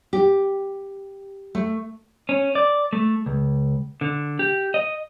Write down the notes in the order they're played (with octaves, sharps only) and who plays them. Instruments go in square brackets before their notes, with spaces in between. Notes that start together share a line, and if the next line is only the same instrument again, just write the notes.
[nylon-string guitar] G4
A3
[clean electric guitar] C#4
D5
A3
C#2
D3
G4
D#5